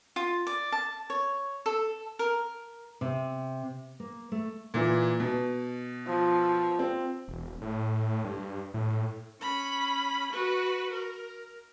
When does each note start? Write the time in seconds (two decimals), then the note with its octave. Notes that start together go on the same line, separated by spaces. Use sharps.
0.16 F4
0.47 D5
0.72 A5
1.10 C#5
1.66 A4
2.19 A#4
3.01 C3
4.00 A#3
4.32 A3
4.74 A#2 E3
5.20 B2
6.07 F3
6.79 C4
7.28 E1
7.62 A2
8.24 G2
8.74 A2
9.41 C#4 B5
10.32 F#4 B4
10.93 A#4